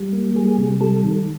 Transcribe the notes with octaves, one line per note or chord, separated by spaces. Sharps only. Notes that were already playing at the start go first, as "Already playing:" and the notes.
Already playing: G3
A#3
G3 G#4
C3
G3 A4
D#3